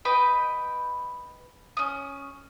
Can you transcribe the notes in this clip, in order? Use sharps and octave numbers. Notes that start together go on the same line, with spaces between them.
B4 D#5 G5 B5
C#4 D#6